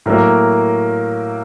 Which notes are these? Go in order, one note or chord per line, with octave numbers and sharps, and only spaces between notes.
A2 F#3 A#3 A#4